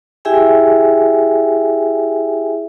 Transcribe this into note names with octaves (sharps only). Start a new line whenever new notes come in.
E4 G4 G#4 E5 G5 G#5